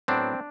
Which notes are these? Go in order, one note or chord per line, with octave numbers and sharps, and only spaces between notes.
A2 F#3 B3 C4 D4